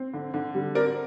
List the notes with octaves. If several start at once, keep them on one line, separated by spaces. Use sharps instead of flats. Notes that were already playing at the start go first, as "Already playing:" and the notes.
Already playing: C4
D3
D3
G3
C4 A#4 D5